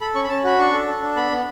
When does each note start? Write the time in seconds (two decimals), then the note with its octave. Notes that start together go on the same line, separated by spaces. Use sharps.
0.01 A4 B5
0.15 C#4 C#6
0.24 B5
0.29 C#4 A5
0.44 F#4 B5
0.59 D4 C#6
0.73 A4
0.87 A4
1.02 D4
1.16 B3 B5
1.31 B3